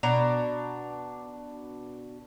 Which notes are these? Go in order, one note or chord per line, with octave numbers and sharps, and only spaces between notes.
B2 D4 A#5